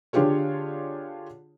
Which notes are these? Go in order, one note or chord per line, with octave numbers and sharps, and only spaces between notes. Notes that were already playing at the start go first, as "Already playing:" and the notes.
D3 D4 F4 G4 G#4 C#5